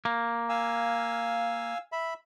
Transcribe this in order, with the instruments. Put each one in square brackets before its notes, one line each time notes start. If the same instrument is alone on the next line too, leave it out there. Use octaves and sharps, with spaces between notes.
[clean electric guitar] A#3
[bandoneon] F5 G#5 E6
E5 B5